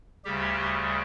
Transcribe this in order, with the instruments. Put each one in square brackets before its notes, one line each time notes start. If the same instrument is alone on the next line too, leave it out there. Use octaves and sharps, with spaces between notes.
[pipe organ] D2 C#3 G3 G4